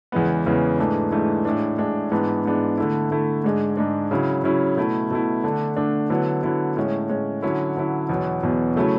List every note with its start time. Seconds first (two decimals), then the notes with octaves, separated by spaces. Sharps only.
0.12 E2 C#3 E3 G#3 B3
0.46 E2 C#3 E3 G#3 B3
0.78 G#2 E3 A3 D4
1.11 G#2 E3 A3 D4
1.45 A2 G#3 D4
1.78 A2 G#3 D4
2.12 G#2 E3 B3 D4
2.45 G#2 E3 B3 D4
2.77 D3 A3 E4
3.11 D3 A3 E4
3.44 G#2 G#3 D4
3.77 G#2 G#3 D4
4.11 C#3 F#3 C#4 E4
4.44 C#3 F#3 C#4 E4
4.77 B2 A3 E4
5.11 B2 A3 E4
5.44 D3 A3 D4
5.77 D3 A3 D4
6.10 D3 F#3 B3 E4
6.43 D3 F#3 B3 E4
6.77 A2 G#3 C#4
7.09 A2 G#3 C#4
7.42 D3 F#3 C#4 E4
7.76 D3 F#3 C#4 E4
8.09 E2 B2 F#3 B3
8.43 E2 B2 F#3 B3
8.75 C#3 F#3 A3 C#4 E4